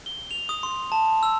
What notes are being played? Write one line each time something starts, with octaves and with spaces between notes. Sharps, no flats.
G7
F7
D#6
C6
A5
E6